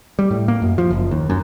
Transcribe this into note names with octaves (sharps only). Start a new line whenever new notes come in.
G3
A2
A#3
F#2
F3
F#1
D#2
F#2